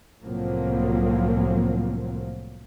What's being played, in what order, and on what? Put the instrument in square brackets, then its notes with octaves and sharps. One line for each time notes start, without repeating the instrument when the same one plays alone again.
[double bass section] C2 A2 F3 F#3 A#3 C4